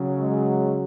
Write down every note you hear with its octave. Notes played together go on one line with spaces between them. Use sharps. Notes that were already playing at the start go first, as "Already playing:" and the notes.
Already playing: C#3 F#3
G#3